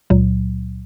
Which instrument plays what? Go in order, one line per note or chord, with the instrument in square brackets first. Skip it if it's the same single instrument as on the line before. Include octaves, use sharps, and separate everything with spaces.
[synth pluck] C#2 A#2 F#3